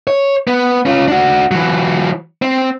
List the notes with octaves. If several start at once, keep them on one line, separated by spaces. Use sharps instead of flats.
C#5
B3
C#4 F4
D4 F#4
E3 F#3
C4